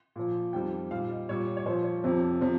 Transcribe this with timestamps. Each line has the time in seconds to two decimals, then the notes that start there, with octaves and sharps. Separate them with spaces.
0.16 A#2 F3
0.53 F2 D#3 G3 G5
0.91 A#2 G3 F5
1.10 D#5
1.29 A#2 G3 C#5
1.57 C#5
1.65 A#2 F3 C5
1.84 C#5
2.04 F2 C3 F3
2.41 C3 F3